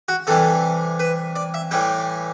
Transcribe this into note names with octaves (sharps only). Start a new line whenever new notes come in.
F#4
C3 E3 G3 A4
B4
D5
E5
A2 E3 G3 G5